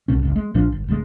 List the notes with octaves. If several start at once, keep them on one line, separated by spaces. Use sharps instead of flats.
C2 B2 C#4
G1 C#2
G#3
A#1 A#2 F3 D4
G1
D1 D2 E3 G#3